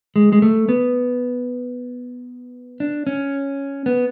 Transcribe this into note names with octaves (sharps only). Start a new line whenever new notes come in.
G#3
G#3
A3
B3
D4
C#4
B3